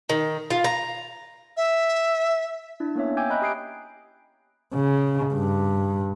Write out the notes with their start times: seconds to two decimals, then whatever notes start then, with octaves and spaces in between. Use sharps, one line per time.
0.09 D#3
0.50 F4
0.64 A#5
1.57 E5
2.80 D4 E4
2.95 A#3 B3 C#4 C#5 E5
3.17 G5 G#5 D6 E6 G6 G#6
3.30 D#5 E5 A#5 B5 F#6 G6
3.42 G4 D#6 C7 D7
4.74 C#3
5.34 G2